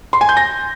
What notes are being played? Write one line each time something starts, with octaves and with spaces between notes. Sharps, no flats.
C6
G#5
G6
A#6